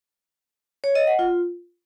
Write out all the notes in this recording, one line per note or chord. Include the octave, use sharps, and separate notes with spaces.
C#5
D#5
F#5
F4